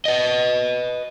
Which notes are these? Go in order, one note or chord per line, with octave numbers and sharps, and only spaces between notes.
B4 D#5